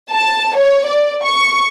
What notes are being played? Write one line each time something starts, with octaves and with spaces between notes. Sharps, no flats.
A5
C#5
D5
C#6